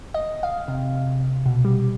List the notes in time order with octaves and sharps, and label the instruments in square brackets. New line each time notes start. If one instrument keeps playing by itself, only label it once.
[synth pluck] D#5
F5
C3
B2
G3